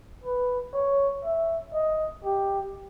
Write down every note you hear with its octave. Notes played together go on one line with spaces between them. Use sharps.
B4
C#5
E5
D#5
G4